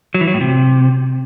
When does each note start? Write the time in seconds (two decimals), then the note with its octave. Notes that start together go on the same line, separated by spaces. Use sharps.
0.14 F#3
0.21 E3
0.28 F#3
0.34 A2
0.41 C3